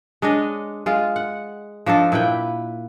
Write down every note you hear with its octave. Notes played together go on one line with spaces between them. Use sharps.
G#3 D4 C#5 D#5
G#3 F4
F#5
F3 D4 D#4 A4
A#2 E4 B4 G5